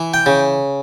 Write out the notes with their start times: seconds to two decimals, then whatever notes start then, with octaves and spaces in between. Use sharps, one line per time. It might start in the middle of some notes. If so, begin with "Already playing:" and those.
Already playing: E3
0.14 G5
0.26 C#3